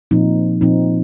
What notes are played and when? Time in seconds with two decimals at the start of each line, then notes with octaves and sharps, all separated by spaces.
0.11 A#2 F3 C4 D#4
0.61 A#2 F3 C4 D#4